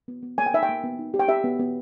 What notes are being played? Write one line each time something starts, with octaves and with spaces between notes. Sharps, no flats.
B3
B3
A#3 G#5
G5
D#4 E5
G5
A#3
B3
D#4
G4
G5
G4 E5
B3
B3